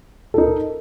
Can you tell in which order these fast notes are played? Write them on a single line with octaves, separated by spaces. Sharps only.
A4 D#4 A#4